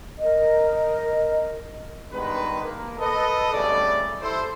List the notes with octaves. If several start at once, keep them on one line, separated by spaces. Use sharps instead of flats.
A#4 D#5
G2 D#3 G#3 B3 B4
A#3
A4 B4 D#5
G#1 C#3 G3 A3 D5
E4 A4 C5